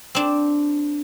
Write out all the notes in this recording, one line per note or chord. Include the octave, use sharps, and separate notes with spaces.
C4 D4